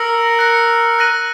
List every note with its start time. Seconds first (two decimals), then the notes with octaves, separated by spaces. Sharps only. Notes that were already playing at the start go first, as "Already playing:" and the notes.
Already playing: A#4 E6 A#6 C#7 F#7
0.39 F#6 A#6 C#7
0.99 F#6 A#6 D#7 F#7